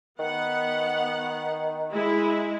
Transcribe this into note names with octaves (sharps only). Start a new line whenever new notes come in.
D#3 B3 F#5
G#3 E4